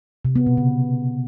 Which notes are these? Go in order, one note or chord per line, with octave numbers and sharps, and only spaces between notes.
C3
B3
B2
C#3